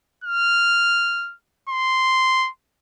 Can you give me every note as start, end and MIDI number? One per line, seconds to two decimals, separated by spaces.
0.24 1.34 89
1.69 2.49 84